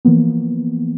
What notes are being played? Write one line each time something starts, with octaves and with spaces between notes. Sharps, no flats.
E3 F3 A#3 B3